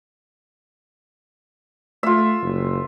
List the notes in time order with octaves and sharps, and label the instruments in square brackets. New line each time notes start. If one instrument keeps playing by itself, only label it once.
[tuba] A3 [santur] F4 E5
[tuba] F#1